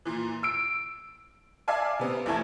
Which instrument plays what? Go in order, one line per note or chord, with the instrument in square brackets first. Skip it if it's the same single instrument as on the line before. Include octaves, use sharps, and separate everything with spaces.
[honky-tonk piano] A#2 E3
E6 D7
D5 E5 F5 G#5 A5
C3 B3 C4
A#1 E3 A3 G#5 A5